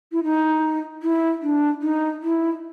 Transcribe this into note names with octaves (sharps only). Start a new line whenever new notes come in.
E4
D#4
E4
D4
D#4
E4